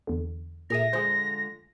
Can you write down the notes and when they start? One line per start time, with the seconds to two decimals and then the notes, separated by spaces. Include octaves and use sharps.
0.07 E2 D3
0.70 A#2 G#4 A#4 E5 A#6 D#7
0.93 D3 F3 G#3 G#4 C5